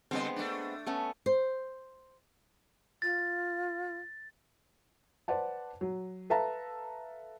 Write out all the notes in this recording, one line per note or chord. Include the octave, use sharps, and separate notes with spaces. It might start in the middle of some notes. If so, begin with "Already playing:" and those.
D3 G3 G#3 B3 C4 C5
A3 D4
A3 B3 C#4
C5
F4 A6
B4 C5 D5 F#5 A5
F#3
A4 B4 E5 F5 A5 A#5